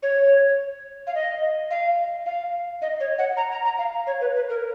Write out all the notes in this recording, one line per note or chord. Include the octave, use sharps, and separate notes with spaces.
C#5
F5
D#5
F5
F5
D#5
C#5
F#5
A#5
A#5
A#5
F5
C#5
B4
B4
A#4